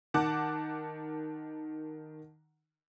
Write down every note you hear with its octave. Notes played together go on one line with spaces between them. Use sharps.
D#3 F#5 A5 D6 F#6